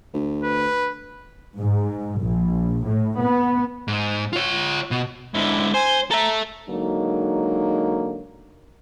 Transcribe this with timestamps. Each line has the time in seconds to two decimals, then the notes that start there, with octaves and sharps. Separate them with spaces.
0.14 D2
0.44 B4
1.58 G#2
2.21 A#1
2.86 A2
3.20 B3
3.88 G#2
4.33 F4 C#5
4.91 B2
5.34 G#2 D3 E4
5.74 C5 G#5
6.11 A4 E5 A#5
6.69 D3 F#3 G#3 A#3 D#4